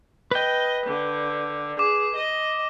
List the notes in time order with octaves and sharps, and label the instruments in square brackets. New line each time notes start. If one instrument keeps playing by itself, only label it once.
[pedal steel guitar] B4 G5 [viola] D#5
[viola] D3
[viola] G#4 [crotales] D6
[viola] D#5